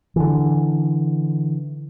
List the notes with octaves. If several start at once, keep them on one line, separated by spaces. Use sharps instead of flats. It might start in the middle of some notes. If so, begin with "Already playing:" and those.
D3 E3